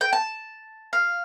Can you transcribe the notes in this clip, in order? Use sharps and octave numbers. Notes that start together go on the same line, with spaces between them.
G5
A5
F5